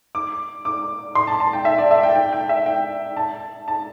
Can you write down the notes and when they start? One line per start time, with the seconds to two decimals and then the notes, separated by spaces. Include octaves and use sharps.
0.15 D6
0.65 D6
1.15 C6
1.27 A5
1.40 A5
1.53 G5
1.65 E5
1.78 D5
1.91 E5
2.03 G5
2.15 G5
2.33 G5
2.49 E5
2.66 G5
3.17 A5
3.68 A5